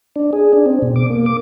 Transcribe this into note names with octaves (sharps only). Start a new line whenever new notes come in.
D4
G#4
D4
C4
B2
D6
A#3
D6